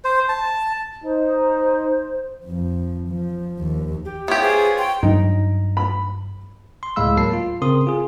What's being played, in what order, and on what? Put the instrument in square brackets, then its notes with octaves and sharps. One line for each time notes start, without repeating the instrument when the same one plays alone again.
[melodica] C5
A5
[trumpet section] D#4 [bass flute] C5
[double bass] F2 F3
F3
D#2
[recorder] G4
[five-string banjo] B3 G4 [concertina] F4 C#5 [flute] E5
[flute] G#4 [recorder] C5
[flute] G5 [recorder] C6
[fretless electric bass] G2 F#3 [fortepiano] D#4
[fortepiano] B5
[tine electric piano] C6
C#2 A2 G#3 F5 B5 E6
D2 F#3 A#3 A5 C7
F4
C#3 C4 A#4 C6 D#6
F4 G#4